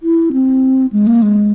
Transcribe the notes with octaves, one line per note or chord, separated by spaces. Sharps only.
E4
C4
G#3
A#3
G#3